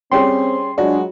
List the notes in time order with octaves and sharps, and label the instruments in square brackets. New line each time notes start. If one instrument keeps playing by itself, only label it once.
[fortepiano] G3 C#4 G#4 [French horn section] C4 [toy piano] C5 C#5 G5 [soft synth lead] C6
[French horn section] F#3 G#3 [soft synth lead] D4 [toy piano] F4 [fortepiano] F#4